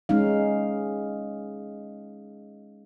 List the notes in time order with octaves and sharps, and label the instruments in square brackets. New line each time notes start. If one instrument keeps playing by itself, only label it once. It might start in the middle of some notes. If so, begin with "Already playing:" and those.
[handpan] G#3 C#4 D#4 F5